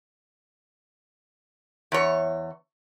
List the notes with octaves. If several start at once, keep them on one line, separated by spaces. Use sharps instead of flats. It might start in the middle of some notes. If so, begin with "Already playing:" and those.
E2 C#5